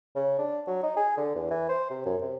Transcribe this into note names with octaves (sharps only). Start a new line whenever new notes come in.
C#3
D4
F#3
D#4
G#4
D3
E2
E3
C5
C3
F#2
C3